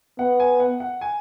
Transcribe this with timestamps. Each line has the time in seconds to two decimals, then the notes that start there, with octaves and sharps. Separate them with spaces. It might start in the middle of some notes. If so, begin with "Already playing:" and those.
0.19 B3 F#5
0.40 G#5
0.60 F#5
0.80 F#5
1.01 G#5